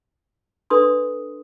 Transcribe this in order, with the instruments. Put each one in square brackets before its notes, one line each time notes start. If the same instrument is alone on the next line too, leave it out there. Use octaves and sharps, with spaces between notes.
[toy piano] D4 A4 B4 C6 D#6